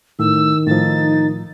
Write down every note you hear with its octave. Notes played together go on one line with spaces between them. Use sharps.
A2 D#3 E6
A2 F3 D#4 A6